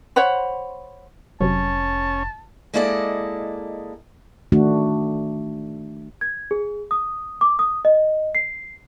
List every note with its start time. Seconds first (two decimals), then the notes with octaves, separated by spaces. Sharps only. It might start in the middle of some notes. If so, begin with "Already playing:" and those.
0.16 C5 C#5 F#5 B5
1.40 F1 C3 F#3 C#4 A5
2.74 G#3 A#3 E4 A4 D5 D#5
4.52 D#3 A3 D4 F#4
6.21 G#6
6.51 G#4
6.91 D#6
7.41 D6
7.59 D#6
7.85 D#5
8.35 C7